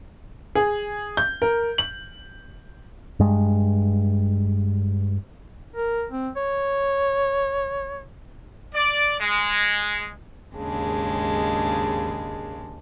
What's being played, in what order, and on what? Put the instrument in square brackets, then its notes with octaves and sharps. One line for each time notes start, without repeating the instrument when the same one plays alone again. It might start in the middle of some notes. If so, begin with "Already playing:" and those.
[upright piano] G#4
G6
A#4
F#7
[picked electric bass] G2 G#3
[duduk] A#4
C4
C#5
[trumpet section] D5
G#3
[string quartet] D#2 G#2 C#3 G#3 D4